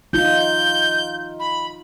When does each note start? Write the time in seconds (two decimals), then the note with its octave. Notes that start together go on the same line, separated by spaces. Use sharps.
0.13 D#4 F4 G6
1.39 B5